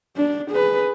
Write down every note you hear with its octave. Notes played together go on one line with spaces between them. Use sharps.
D4
G#4 B4